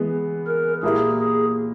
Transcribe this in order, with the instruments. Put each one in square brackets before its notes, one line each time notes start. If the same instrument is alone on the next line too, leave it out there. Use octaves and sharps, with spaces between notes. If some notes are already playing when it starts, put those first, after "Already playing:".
Already playing: [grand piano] E3 G#3 B3
[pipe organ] A#4
[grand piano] A#2 A#3 E4 G4 A#4 [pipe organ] G#4
[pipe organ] G#4